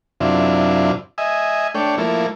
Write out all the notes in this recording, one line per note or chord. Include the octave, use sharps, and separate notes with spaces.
F#2 C3 D4 E4 F4
D#5 E5 G#5
A3 D4 C#5 G5
F3 A3 A#3 E4